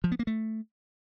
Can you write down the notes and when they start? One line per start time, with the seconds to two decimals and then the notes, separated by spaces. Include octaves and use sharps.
0.04 F3
0.12 B3
0.19 A#3
0.27 A3